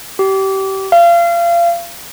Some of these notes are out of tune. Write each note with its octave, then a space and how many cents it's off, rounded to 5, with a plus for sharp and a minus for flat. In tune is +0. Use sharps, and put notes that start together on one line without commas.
G4 -25
F5 -30